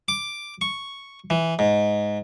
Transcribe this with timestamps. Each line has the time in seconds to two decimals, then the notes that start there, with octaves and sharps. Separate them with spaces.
0.08 D6
0.61 C#6
1.30 E3
1.59 G#2